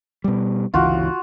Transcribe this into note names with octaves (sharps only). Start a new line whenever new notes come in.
B2 G3
G1 C#2 E3 F4 F#4